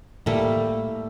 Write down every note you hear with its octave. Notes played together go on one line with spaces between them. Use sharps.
A2 G3 A3 A#3